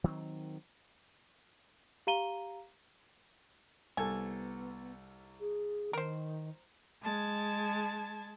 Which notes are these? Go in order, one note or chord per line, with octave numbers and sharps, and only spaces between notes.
D#3 F#3 A#3 C4
G4 F5 A#5 D#7 G7
C2 B3 A4 G#5
G#4
D#3 A#4 C5
G#3 A5 G#6